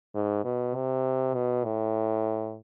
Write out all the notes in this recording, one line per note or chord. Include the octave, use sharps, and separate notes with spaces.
G#2
B2
C3
B2
A2